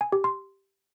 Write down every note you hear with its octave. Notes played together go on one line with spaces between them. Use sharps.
G#5
G4
C6